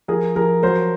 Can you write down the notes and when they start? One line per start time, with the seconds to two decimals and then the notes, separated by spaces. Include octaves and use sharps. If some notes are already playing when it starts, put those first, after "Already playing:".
0.08 F3 G#4 A#4
0.36 F3 G#4 A#4
0.63 F#3 A#4 C5